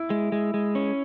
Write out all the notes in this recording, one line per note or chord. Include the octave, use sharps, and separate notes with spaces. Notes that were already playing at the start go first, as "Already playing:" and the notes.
Already playing: E4
G#3
G#3
G#3
C#4